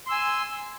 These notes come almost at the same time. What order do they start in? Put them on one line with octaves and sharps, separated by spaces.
C6 E6 G#5